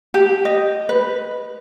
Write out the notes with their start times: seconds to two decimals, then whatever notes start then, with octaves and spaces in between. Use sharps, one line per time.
0.14 G4
0.45 D#5
0.89 B4